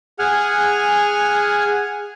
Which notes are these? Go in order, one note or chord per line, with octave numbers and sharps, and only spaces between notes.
G#4 F#5 G#5 F6